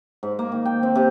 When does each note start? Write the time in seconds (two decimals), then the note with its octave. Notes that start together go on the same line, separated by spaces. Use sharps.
0.23 G#2
0.39 A#3
0.52 D#3
0.65 G5
0.83 C4
0.95 C3